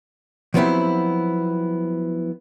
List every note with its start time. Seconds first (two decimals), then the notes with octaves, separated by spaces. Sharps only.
0.54 F3 F#3 B3 C4 E4 G4